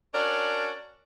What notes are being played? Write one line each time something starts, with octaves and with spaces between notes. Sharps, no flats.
C#4 D4 F#4 A#4 C#5 D5